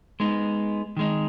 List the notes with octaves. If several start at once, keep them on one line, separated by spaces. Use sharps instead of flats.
G#3 B3 D#4
D#3 G#3 D#4